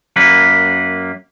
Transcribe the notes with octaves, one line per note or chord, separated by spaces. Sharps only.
F#2 A#3 B4